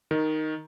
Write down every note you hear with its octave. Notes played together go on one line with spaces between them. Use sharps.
D#3